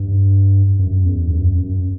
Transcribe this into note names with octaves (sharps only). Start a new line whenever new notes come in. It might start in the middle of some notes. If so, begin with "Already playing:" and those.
Already playing: G2
F#2
E2
G2
F#2
F#2